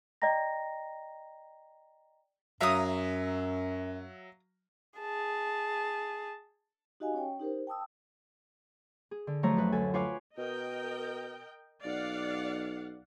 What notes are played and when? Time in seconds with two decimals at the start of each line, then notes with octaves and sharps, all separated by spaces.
0.22 D5 D#5 G5 A#5 A#6
2.61 F#2 F#3 E5 F5 A#5 D#6
4.99 G#4 A5
7.00 D#4 F#4 G4 D#5 F5 G#5
7.14 C#4 C#5 G5
7.40 D#4 G4 A#4 C5
7.67 G5 A5 D#6 E6
9.11 G#4
9.27 D3
9.43 F3 F#3 A3 C#5 A#5
9.57 F#2 B4
9.72 D2 A4 G#5
9.94 F4 B4 C#5 F5 G#5 D6
10.38 B2 A#4 D#5 G5
11.85 B1 D5 F5 F#5